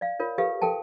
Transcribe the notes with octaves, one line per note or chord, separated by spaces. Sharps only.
D5 F5
F4 A#4 C#5
G4 A4 B4 F5
A4 A#4 G5 A5